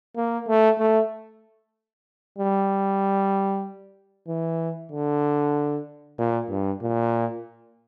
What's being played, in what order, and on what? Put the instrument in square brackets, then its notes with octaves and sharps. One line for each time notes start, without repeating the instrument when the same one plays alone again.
[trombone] A#3
A3
A3
G3
E3
D3
A#2
G2
A#2